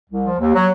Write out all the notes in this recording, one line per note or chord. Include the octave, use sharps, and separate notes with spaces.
C2
F3
D#2
F#3